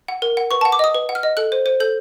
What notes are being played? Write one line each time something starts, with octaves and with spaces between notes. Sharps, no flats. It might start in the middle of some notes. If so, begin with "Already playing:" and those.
F#5
A#4
F#5
B4 C#6
A5
F#5
D6
D#5 D#6
B4
F#5
F6
D#5
A4 F#6
C5
C5
A4 G6